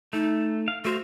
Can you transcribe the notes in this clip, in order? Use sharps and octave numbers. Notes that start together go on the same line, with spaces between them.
A3 D#4
F5
A3 F#4 C5 F5